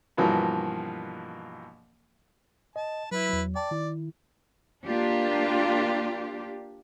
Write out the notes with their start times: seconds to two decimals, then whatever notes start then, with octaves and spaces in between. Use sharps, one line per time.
0.17 G2 B2 E3 F3 A#3
2.76 D#5 A5
3.12 F#3 E4 B4
3.30 E2 F#3
3.56 D5 G5 A5
3.71 D#3 E4
4.86 A#3 D4 F4 G4